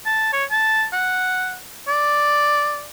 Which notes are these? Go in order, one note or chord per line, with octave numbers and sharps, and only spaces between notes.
A5
C#5
A5
F#5
D5